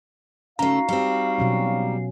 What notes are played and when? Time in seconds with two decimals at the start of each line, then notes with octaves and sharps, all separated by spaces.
0.59 C#3 A3 D#4 F#4 F5 A#5
0.89 G3 C4
1.38 B2 F#3 C#4